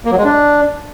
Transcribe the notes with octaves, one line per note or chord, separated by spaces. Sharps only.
A#3
F#3
G#3
D4